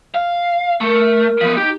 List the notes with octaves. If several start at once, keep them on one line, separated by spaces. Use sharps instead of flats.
F5
A3 A#4
F3 B3
D#4 G4